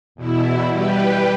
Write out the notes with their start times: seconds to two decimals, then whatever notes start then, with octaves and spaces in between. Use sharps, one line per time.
0.15 E2 B2 E4
0.68 G3 G4 B4